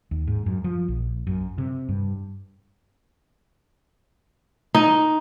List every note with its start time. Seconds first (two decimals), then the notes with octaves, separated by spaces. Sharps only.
0.11 D#2
0.27 G#2
0.46 F#2
0.64 F3
0.88 A#1
1.27 F#2
1.58 C3
1.89 G2
4.75 D#4